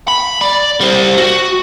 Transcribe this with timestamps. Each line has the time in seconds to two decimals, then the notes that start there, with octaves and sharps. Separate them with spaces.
0.08 B5
0.41 D5
0.81 G3 C5
1.18 F#4